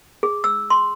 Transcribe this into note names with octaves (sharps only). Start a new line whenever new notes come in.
G#4
E6
C6